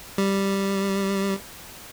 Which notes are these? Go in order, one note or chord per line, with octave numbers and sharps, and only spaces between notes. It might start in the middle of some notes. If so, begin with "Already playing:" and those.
G3